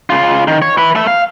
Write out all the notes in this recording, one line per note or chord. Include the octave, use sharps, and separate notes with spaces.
C#3 F4
D#3
C#5
E4 B4
A3 E5
F5